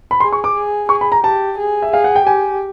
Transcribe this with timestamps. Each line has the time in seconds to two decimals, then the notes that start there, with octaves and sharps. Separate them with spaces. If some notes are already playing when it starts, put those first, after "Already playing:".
0.11 B5
0.20 G#4 C6
0.33 C#6
0.44 D6
0.55 G#4
0.89 G#4 C#6
1.01 B5
1.12 A#5
1.23 G4 A5
1.58 G#4
1.82 E5
1.91 G#4 F5
2.04 F#5
2.16 G5
2.26 G4 G#5